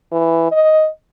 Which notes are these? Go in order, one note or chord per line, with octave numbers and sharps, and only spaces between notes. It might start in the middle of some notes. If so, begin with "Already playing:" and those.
E3
D#5